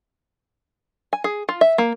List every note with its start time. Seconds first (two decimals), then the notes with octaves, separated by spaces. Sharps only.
1.13 G#5
1.24 G#4
1.49 F4
1.61 E5
1.78 A#3